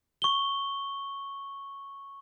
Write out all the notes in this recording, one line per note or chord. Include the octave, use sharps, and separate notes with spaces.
C#6 G7